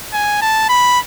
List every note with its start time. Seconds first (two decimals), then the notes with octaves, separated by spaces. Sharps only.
0.13 G#5
0.41 A5
0.69 B5